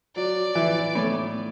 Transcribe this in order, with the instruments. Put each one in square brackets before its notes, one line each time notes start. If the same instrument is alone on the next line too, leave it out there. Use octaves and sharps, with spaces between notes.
[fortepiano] F#3 [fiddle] D5
[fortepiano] E3
A2